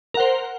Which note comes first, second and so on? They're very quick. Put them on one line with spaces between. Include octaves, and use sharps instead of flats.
A#4 F#5 C5